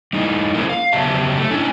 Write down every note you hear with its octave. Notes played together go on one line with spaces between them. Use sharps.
G3 D#4 E4
A3 A#3 C#4 E4 G#4 A#4
F5
C#3 F#3 B3 G4 E5 A5
A3
C#4 D4 E4 G#5